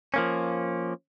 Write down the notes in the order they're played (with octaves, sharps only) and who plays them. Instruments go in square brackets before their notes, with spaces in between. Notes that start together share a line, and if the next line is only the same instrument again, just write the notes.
[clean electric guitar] F3 A#3 C#4